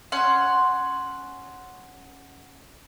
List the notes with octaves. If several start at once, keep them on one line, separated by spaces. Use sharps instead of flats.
C#4 F#5 C6